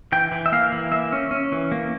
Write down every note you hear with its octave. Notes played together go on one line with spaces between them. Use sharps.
E3 G5
E3
E5
A#3 F5
E3
A#3 E5
C#4
C#4
E3
A#3